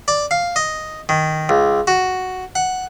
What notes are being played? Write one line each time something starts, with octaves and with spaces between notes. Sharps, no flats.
D5
F5
D#5
D#3
C#2
F#4
F#5